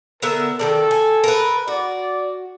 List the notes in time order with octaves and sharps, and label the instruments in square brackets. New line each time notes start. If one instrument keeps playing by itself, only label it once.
[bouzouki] D3 B3 E5 [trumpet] A#4
[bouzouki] D#3 G#3 D5 [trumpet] A4
[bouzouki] G#5
A#4 B4
[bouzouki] F#4 [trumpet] D5